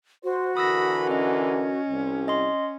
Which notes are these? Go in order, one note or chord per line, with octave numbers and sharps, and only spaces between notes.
F#4 C5
D3 E3 A#4 B5 D#6 E6 A#6
C#4 D#5
C2
D#5 C6